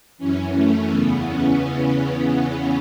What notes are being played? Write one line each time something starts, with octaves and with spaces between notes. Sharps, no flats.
F#2 E3 C#4
A3
E2 C#3 E3 B3
C#4